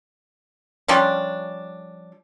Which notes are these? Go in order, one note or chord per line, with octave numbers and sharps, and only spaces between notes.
F3 G3 C#4 D4